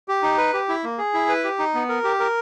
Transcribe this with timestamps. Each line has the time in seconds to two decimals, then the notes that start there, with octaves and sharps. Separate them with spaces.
0.08 G4
0.23 D#4
0.38 B4
0.53 G4
0.68 E4
0.84 A#3
0.98 G#4
1.14 E4
1.28 B4
1.44 G4
1.59 D#4
1.74 B3
1.89 A#4
2.04 G4
2.20 A#4